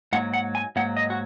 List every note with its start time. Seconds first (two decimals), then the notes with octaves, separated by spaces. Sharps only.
0.13 G#2 F#3 A#3 F#5
0.33 F#5
0.55 G#5
0.76 G#2 F#3 A#3 F#5
0.97 D#5
1.10 F#4